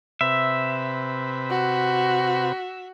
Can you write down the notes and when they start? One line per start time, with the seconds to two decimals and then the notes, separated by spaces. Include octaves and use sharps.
0.21 C3 B4 E5
1.50 F#4